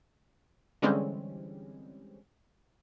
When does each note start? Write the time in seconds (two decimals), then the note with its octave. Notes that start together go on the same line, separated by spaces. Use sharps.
0.82 D3 E3 G3 G#3 C4 C#4